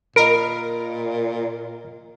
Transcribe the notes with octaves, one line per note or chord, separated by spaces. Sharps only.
A#2 A#4 D#5 B5 D7